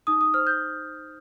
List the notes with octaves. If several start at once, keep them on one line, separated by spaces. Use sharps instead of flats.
D#4 D#6
D#6
C5 F6
G6